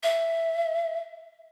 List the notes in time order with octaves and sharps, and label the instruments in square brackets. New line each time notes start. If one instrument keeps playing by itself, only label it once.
[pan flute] E5